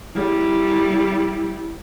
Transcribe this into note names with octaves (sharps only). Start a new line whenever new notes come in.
G3 E4